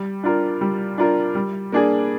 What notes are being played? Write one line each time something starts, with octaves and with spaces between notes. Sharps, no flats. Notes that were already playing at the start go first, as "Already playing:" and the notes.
Already playing: G3
D4 F4 A#4
G3
D4 F4 A#4
G3
A#3 D4 G#4